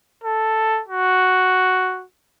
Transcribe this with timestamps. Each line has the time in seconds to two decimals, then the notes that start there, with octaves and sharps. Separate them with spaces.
0.24 A4
0.88 F#4